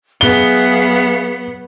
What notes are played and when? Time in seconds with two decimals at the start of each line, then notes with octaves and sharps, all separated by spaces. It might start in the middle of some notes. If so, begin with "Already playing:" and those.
0.21 F#3 B3 G#4 E5 F5 G7